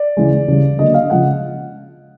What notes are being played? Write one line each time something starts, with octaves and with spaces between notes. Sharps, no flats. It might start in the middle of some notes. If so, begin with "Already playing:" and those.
Already playing: D5
C#3 E3 G#3
C#3 E3 G3
D3 F#3 A#3 D#5
F5
C#3 F3 G#3 F#5